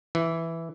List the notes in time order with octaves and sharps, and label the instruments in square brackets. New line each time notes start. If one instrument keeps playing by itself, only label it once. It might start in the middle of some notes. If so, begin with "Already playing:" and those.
[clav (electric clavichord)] E3